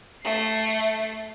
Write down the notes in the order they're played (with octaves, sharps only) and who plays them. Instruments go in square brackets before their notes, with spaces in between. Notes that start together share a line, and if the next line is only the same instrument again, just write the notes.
[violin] A3 C7